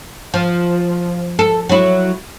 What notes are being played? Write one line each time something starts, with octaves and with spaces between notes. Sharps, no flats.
F3
A4
F#3 E4